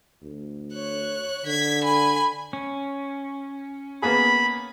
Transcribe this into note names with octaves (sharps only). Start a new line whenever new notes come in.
D2
C#5 F#6
D3 G#6 B6
G#5 B5
C#4
A#3 B3 G#4 B5